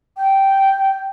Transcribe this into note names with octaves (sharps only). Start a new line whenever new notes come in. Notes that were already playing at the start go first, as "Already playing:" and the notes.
G5